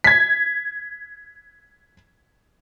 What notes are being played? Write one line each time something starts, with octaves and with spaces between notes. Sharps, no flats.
G#6 B6